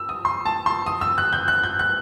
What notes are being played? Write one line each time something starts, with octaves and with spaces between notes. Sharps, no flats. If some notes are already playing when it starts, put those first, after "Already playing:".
Already playing: E6
D#6
C6
A5
C6
D#6
E6
F#6
G6
F#6
G6
F#6